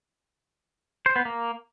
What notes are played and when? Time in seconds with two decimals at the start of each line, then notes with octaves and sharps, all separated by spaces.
1.06 C5
1.16 B3
1.25 A#3